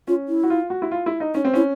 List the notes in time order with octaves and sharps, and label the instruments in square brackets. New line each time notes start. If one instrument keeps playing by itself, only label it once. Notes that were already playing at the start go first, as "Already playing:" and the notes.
[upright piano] C#4 [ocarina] F4
[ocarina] E4
[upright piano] F#4
F4
F#4
E4
F4
E4
D#4
[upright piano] C#4 [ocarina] D#4
[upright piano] C4
[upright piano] C#4 [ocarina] E4